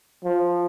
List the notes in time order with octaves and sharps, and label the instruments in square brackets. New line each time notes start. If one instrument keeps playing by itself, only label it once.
[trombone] F3